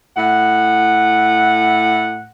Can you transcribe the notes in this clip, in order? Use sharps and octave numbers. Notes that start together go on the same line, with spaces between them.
A2 F#5